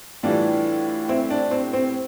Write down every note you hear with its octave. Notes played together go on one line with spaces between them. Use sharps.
A2 E3 G3 D4 F4
C4 E4
D4
C4
C4